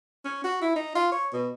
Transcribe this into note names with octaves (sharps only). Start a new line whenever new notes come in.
C#4
F#4
E4
D#4
F4
C#5
B2